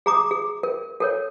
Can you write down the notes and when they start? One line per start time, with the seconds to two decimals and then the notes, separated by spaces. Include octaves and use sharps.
0.06 G#4 A#5 D6 D#6
0.31 G#4
0.63 A#4
1.00 A4 A#4 C#5